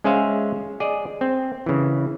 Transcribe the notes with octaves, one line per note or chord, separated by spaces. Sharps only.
G#3 C#4 G#4 C5 E5 F5
G#4 D5 D#5
C4
C#3 E3